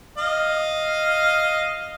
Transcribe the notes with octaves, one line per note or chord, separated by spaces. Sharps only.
D#5 F5